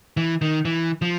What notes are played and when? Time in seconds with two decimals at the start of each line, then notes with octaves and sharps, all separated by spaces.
0.17 E3
0.42 D#3
0.65 E3
1.02 F3